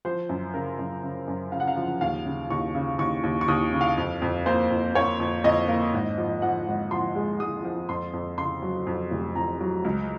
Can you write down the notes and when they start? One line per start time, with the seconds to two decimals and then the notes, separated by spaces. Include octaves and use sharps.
0.05 F3 C5
0.29 F#2
0.54 C#3 A#4
0.79 F#2
1.03 C#3
1.28 F#2
1.52 C#3 F5
1.60 F#5
1.67 F5
1.76 F3
2.01 D#2 F5
2.26 C#3
2.50 D#2 C#6
2.75 C#3
2.98 D#2 C#6
3.23 D#2
3.41 C#6
3.48 D#2 D#6
3.73 C#3
3.81 F5
3.97 F2
4.22 F2
4.46 A#3 C5
4.70 F2
4.95 A#3 C#5
5.20 F2
5.44 F2 D#5
5.68 A#3
5.93 G#1
6.17 F3
6.42 F3 F#5
6.66 G#1
6.91 F3 C6
7.15 G#3
7.40 G#3 D#6
7.64 F3
7.89 F2 C6
8.13 F2
8.38 C#3 C6
8.62 F#3
8.87 F2
9.11 F1
9.36 F2 A#5
9.61 F#3
9.84 C#2